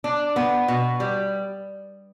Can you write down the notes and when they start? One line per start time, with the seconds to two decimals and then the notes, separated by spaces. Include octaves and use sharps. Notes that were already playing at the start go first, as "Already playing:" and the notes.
0.04 D4
0.36 B3
0.68 B2
1.00 G3